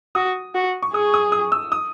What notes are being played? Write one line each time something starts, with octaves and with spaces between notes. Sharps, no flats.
F#4 D#6
F#4
C#6
G#4 D#6
D#6
D#6
E6
D#6